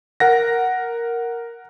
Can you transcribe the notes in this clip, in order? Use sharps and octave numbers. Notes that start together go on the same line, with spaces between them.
A#4 F#5 A#6